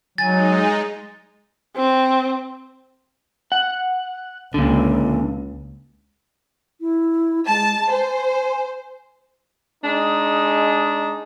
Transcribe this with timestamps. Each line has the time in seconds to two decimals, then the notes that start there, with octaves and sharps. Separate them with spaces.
0.18 F#3 G#3 D#4 G#5 A6
1.76 C4
3.52 F#5
4.54 C#2 A#2 D3
6.81 E4
7.48 G#3 A5
7.91 C5 G#5
9.84 G#3 D4 D#4